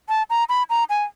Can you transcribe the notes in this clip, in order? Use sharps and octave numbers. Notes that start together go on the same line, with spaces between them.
A5
A#5
B5
A#5
G#5